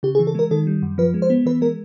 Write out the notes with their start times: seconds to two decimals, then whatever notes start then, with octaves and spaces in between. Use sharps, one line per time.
0.03 C#3 G4
0.15 G#4
0.19 E3
0.27 A4
0.35 G#3 A#4
0.51 D#3 A4
0.67 G3
0.82 F#2
0.98 F3 B4
1.14 G#3
1.22 C5
1.30 B3
1.46 E3 B4
1.61 G#3 A#4